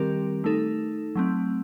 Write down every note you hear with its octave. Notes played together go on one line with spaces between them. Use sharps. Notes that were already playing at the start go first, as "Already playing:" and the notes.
Already playing: D#3 G3 C4 G4 A#4
A3 D#4 A4
F#3 A3 C4